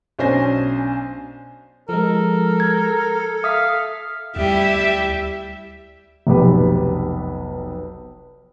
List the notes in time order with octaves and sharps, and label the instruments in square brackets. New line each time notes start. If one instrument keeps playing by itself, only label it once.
[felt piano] B1 C#4 D4 C5 G#5 A#6
[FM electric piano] F3 G#3 [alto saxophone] A4 [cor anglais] A#4
[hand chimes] G#6
[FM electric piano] E5 B6 [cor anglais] F5 [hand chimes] D#6
[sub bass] D2 [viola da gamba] G3 E4 G4 [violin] E5
[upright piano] F1 B1 B3 G4 B4 B5